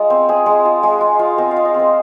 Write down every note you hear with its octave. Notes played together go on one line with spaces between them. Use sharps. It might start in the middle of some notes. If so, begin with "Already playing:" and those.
Already playing: G#3 F4
C4
C4 G#4
G#3
F4
G#3
F4
F4
C4 D#5
F5
F4
D#5
C4 C5